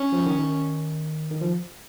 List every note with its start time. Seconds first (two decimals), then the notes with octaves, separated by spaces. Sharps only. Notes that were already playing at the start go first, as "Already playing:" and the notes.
Already playing: C#4
0.12 F3
0.26 D#3
0.39 D#3
1.31 D#3
1.41 F3